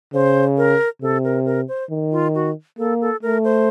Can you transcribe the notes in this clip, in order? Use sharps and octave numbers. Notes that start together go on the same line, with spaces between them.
C#3 C5
A#4
C3 A4
A#4
A#4
C5
D#3
F4
F#4
A#3 A4
A4
A3 A#4
C5